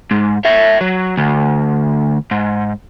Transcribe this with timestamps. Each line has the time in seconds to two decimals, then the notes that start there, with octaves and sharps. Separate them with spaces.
0.11 G#2
0.45 C#5 E5
0.81 F#3
1.17 D2
2.31 G#2